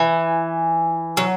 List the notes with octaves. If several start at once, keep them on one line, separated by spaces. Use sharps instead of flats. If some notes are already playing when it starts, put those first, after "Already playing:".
Already playing: E3
F#3